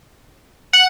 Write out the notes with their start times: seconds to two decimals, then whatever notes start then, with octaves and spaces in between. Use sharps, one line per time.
0.73 F#5 F#7